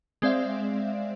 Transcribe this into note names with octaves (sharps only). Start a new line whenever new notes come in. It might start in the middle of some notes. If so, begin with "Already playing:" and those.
G#3 C4 C5 D5 E5 F5